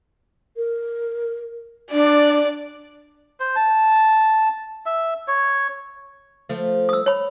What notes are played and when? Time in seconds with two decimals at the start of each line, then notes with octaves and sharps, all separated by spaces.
0.57 A#4
1.92 D4 D5
3.40 C5
3.56 A5
4.86 E5
5.28 C#5
6.49 F3 A3
6.89 D#6 E6
7.06 C#5 B5